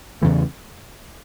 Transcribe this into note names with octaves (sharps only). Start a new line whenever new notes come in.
E2 C#3 E3 A3